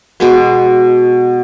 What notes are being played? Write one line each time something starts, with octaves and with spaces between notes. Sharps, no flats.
B2 G#3 B3